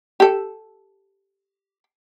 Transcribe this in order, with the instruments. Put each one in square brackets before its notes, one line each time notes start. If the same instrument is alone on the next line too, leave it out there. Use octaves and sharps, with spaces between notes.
[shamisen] G4 A4